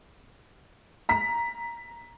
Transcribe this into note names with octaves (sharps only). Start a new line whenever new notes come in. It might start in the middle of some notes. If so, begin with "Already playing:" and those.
A#5 B6